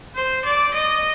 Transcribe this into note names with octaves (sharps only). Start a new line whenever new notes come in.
C5
D5
D#5